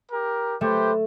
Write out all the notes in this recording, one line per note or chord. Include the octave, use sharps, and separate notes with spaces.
G4 A#4
A3 G4 B4 C5